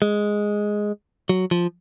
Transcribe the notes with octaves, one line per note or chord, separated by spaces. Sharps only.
G#3
F#3
F3